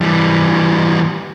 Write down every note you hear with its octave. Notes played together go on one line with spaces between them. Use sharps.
E3 G3